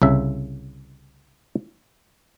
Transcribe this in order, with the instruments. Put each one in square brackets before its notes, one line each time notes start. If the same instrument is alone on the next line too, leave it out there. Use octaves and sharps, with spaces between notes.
[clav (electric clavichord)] C2 C#3 E5